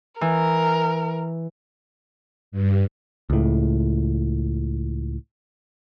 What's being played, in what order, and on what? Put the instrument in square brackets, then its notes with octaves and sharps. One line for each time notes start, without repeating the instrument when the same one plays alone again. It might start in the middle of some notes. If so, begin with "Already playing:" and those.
[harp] E3 [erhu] A#4
[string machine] G2
[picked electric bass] C#2 A2